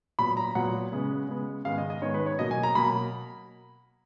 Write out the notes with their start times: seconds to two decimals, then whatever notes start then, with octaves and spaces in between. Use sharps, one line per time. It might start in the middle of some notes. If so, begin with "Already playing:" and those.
0.19 A#2 F#3 B3 B5
0.37 A#5
0.55 A#2 F#3 B3 F#5
0.92 C#3 G#3 B3
1.29 C#3 G#3 B3
1.65 G#2 D#3 G#3 B3 F5
1.78 D#5
1.90 D#5
2.02 G#2 D#3 G#3 B3 C#5
2.14 B4
2.26 C#5
2.39 B2 F#3 A#3 D#5
2.51 G#5
2.63 A#5
2.75 B2 F#3 A#3 B5